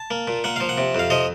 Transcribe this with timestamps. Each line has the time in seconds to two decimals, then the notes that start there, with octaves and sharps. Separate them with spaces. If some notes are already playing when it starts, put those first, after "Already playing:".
Already playing: A5
0.11 A#3
0.28 A#2
0.44 A#3 F#5
0.56 F3 F5
0.69 F#5
0.78 C3
0.95 F2 F5
1.10 F3 D#5